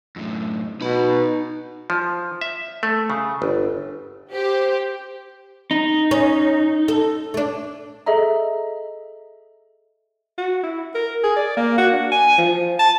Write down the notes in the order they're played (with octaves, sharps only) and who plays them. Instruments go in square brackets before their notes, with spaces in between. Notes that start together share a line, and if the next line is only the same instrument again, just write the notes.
[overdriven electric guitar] F#2 A2
[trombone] B2 [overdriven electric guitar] D#4 B5
[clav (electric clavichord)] F3
E5
A3
C#3
G1
[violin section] G4 [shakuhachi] C5
[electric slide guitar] D#4
[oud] C#4
A4
A3 D4
[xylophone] G#4 A4 D#5 E5 A#5
[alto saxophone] F#4
E4
A#4
G#4
D5
A#3
F#4
D4
G#5
F3
A5